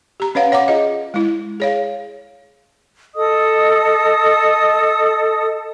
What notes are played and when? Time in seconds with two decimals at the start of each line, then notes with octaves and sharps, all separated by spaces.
0.20 G4 A#5
0.35 C#4 B4 C#5 F5 F#5
0.52 C#5 F#5 A#5 D6
0.68 F4 G#4 D#5
1.14 G#3 E4
1.60 G#4 C#5 F5
3.15 A4 D#5 D#6